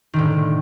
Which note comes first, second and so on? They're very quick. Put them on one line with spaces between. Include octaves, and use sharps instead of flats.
D#3 D3 A2